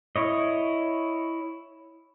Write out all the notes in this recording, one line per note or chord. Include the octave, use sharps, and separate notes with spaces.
E4 C#5 D#5